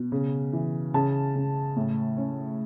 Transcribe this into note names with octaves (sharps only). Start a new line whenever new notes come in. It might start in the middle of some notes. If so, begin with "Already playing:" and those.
Already playing: B2
C#3
E3
C#3 A5
C#3
A2
C#4